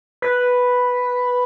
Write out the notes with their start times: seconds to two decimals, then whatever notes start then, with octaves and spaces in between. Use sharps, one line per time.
0.22 B4